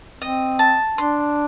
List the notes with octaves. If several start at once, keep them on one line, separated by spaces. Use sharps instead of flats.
C4 D#5
A5
D4 C6